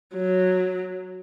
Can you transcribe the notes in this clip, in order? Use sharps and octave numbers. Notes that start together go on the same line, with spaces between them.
F#3